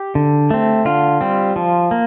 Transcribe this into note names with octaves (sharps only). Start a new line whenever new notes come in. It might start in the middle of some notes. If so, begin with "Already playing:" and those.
Already playing: G4
D3
A3 C4
D3 F4
G3 C4
F3
A#3